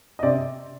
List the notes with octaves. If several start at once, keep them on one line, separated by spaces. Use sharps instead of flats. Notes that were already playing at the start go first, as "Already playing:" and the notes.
D#5
C3 D5